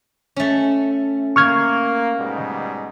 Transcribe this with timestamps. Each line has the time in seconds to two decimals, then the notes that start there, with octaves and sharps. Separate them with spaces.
0.36 A3 C#4
1.36 A#3 C#6 F6 G#6
2.17 G#2 B2 G3